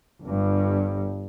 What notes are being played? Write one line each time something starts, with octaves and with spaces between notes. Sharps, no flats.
G1 G2